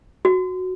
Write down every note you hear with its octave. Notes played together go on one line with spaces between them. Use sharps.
F#4